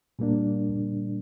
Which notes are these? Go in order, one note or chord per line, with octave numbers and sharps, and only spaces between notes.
A#2 G3 A#3 D4